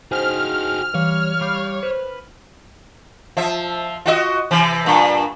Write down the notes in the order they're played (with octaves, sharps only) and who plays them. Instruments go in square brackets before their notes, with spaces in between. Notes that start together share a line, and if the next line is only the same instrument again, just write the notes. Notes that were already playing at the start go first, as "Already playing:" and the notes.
[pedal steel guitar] D#4 [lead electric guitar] F#4 G#4 [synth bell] C5 [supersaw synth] F6
[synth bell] E3 F5 [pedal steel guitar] G3 [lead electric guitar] C#5
[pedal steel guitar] G3 F5 [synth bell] B5 D6 G6
[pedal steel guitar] B4 [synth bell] C5 F6
[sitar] F3 E5
F4 F#4 D#5
C3 E3
G2 A#2